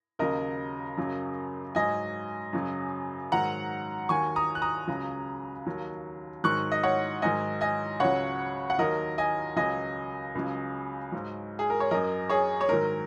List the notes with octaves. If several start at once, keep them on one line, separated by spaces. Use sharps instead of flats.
D#2 C#3 F#3 A#4 D#5
F#2 C#3 F#3
G#2 F#3 D#5 G#5
F#2 C#3 F#3
G#2 D#3 F#3 F#5 A#5
D#2 D#3 F#3 G#5 C#6
A#5 D#6
F#6
A#5 D#6
C#2 C#3 F#3
D#2 D#3 F#3
G#2 D#3 F#3 C#6 F#6
D#5
C#5 F#5
G#2 D#3 F#3 D#5 G#5
D#5 G#5
C#2 C#3 F#3 C#5 F#5
F#5
D#2 D#3 F#3 A#4 D#5
D#5 G#5
C#2 C#3 F#3 D#5 G#5
C#2 C#3 F#3
G#2 F#3
G#4
A#4
C#5
F#2 F#3 A#4 D#5
G#4 C#5
C#5
G#2 D#3 F#3 A#4